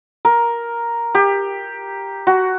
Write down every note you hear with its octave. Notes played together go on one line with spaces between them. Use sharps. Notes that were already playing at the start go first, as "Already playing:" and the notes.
A#4
G4
F#4